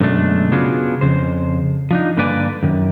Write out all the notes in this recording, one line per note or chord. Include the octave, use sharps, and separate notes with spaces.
F#2 B2 D3 G#3 A3 D4
C#3 B3 D4 F4 F#4 G#4
F2 G#2 C#3 C5
F3 D4 D#4
G2 D3 A#3 B4 D5 G#5
F#2 D#3